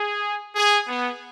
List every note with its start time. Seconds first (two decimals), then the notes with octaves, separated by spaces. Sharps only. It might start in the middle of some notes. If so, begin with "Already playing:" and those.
Already playing: G#4
0.55 G#4
0.87 B3